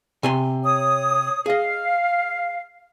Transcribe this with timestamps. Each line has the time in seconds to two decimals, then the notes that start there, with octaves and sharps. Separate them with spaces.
0.23 C3 G#5 C6
0.64 C#5 D#6
1.46 G#4 D#5 F5